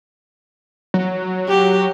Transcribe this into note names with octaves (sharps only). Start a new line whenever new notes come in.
F#3
G4